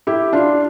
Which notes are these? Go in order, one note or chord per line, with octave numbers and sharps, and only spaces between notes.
E4 G4
D4 F4